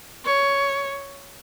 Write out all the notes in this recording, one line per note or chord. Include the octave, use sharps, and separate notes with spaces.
C#5